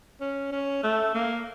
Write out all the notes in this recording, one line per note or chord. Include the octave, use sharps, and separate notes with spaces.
C#4
C#4
A3
A#3